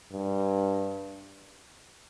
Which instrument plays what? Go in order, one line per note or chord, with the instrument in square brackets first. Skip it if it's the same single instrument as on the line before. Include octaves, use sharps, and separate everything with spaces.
[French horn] G2